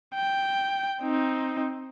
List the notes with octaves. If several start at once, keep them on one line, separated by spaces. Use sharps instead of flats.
G5
C4 D#4